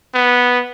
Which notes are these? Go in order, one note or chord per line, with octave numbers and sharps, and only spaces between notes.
B3